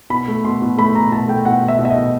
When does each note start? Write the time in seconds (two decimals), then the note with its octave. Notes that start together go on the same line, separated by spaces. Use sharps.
0.10 B2 B5
0.28 A3
0.44 B2 C6
0.62 B2
0.78 A3 B5
0.95 B2 A#5
1.11 B2 A5
1.28 A3 G5
1.45 B2 F#5
1.62 B2
1.68 E5
1.79 B2
1.85 E5
1.90 D#5
1.96 B2